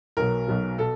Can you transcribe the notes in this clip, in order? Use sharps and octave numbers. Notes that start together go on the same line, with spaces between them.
B1 B2 F#3 A#4
B1 B2 F#3
B2 A4